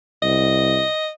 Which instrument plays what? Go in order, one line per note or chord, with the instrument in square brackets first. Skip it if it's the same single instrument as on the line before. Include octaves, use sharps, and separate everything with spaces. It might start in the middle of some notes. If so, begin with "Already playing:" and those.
[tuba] C2 [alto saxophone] D#5